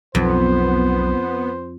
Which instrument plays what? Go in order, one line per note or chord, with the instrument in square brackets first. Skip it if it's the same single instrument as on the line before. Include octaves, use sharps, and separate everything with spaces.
[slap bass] B1 [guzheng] F2 [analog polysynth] B3 [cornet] C5